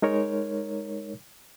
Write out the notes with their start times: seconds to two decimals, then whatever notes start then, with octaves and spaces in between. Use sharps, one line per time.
0.02 G#3 D#4 A#4 C#5